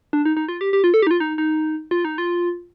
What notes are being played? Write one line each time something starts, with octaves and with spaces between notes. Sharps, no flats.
D4
D#4
D#4
F4
G4
G4
F4
A4
G4
D#4
F4
D#4
D#4
F4
D#4
F4